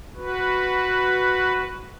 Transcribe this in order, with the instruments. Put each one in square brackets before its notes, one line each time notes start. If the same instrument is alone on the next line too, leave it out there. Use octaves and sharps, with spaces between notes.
[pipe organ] F#4 B4